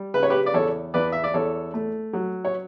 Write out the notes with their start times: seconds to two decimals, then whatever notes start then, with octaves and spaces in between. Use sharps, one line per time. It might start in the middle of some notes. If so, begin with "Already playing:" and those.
Already playing: G3
0.14 C#3 B4
0.23 C#5
0.30 G4 B4
0.46 D5
0.54 E2 A4 C#5
0.94 E2 B4 D5
1.12 E5
1.24 D5
1.34 E2 A4 C#5
1.74 A3
2.13 F#3
2.45 C#5